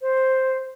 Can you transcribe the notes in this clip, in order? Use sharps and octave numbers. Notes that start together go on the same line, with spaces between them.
C5